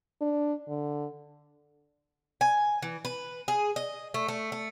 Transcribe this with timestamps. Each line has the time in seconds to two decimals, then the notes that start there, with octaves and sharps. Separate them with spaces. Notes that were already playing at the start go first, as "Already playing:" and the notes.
0.21 D4
0.68 D3
2.41 G#5
2.82 E3
3.05 B4
3.48 G#4
3.76 D#5
4.14 A3
4.28 A3
4.52 A3